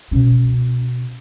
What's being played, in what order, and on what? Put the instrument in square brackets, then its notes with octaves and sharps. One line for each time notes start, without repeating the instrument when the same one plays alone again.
[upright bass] B2 C#4